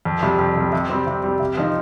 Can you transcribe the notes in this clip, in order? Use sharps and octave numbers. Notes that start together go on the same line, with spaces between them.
F2
C3 G3
F2
C3 G3
C3
G3 C4
C3
G3 C4
C3
F3 C4 D#4